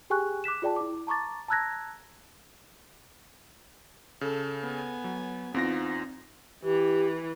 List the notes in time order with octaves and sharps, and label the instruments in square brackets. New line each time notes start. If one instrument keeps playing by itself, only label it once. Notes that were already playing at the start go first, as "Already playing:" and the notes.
[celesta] G4 G#4 G5 G#5 C#6 F#6
D6 F#6 B6 E7
F4 G#4 D5 G5 A5
E4 D6
A5 A#5 C#6 D6 A6
A5 A#5 E6 F#6 G#6 A#6
[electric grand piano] C#3 [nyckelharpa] A4
[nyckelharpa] B3 G#5
[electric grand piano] F#3
[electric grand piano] E2 F4 A#6 [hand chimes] C4 [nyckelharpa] D#4
[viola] E3 [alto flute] G4